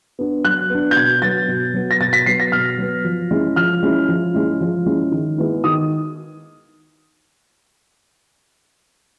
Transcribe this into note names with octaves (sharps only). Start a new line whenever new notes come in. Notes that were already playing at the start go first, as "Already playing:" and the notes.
B3 D4
F#3 F#6
B3 D4
G6
B2 G#6
F#3 B3 A6
B2
F#3 B3
A#6
B2 A6
B6
F#3 B3 C7
A#6
B2 F6
F#3 B3
F3
G#3 C#4 E4
F3 F6
G#3 C#4 E4
F3
G#3 C#4 E4
F3
G#3 C#4 E4
D#3
G#3 B3 E4
D#3 D#6